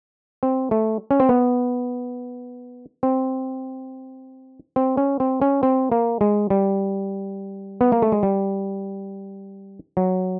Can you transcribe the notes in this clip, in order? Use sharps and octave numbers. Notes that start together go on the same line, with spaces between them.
C4
A3
C#4
C4
B3
C4
C4
C#4
C4
C#4
C4
A#3
G#3
G3
B3
A#3
A3
G#3
G3
F#3